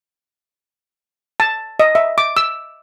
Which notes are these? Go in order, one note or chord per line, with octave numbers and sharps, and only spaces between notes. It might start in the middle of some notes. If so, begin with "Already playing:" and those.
A5
D#5
E5
D6
E6